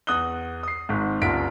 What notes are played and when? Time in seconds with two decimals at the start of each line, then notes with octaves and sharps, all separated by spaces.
0.07 E2 D#6 F#6 G7
0.63 D#6 C7
0.89 G#1 G#2
1.22 F#1 C2 F4 F#5 B6 D7